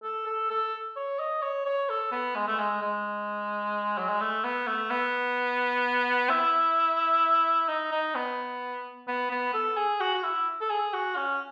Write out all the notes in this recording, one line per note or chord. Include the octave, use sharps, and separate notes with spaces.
A4
A4
A4
C#5
D#5
C#5
C#5
A4
B3
G#3
A3
G#3
G#3
F#3
G#3
A3
B3
A3
B3
E4
D#4
D#4
B3
B3
B3
A4
G#4
F#4
F#4
E4
A4
G#4
F#4
C#4